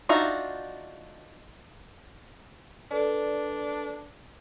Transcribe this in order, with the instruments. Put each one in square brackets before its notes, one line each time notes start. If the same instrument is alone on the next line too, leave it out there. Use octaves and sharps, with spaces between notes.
[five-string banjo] D4 D#4 F4 F#4 E5
[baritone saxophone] D4 [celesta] A4 B4 D5